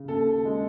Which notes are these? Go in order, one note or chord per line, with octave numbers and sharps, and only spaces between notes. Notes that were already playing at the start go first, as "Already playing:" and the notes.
Already playing: C#3
D#2 A4
G#3